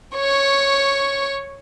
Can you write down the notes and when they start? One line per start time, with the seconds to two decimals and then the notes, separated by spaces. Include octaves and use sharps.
0.16 C#5 C#6